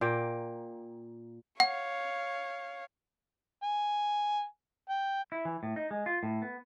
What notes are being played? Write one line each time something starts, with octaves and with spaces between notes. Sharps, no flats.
A#2 A#3 G5
C#5 F5 F#5
G#5
G5
E4
E3
A2
D#4
G#3
F4
A2
B3